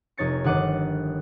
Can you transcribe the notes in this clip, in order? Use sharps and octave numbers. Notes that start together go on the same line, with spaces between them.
F1 D#4 C#5 A6 C#7
G1 D#3 F#5 D6 D#7